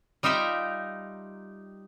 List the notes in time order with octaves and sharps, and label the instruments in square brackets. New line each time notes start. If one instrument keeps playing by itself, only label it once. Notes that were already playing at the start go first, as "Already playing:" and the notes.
[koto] G3 D#4 F4 E5 G5 A#5